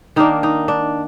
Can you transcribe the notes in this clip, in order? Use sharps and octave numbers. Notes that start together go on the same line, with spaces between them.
D#3 A#3 D4 D#4
D#4
D4